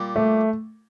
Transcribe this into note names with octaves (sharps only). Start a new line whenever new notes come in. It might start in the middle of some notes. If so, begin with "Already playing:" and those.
Already playing: A#2 G3
A3